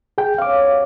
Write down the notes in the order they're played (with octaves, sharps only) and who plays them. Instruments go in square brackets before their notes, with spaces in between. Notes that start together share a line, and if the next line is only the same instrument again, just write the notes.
[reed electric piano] G#4 G5
[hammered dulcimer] G2 C4 C#4 [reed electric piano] F5 D6
[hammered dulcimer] E4 F#4